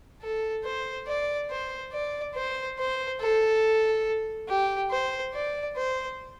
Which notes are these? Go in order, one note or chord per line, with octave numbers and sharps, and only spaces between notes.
A4
C5
D5
C5
D5
C5
C5
A4
G4
C5
D5
C5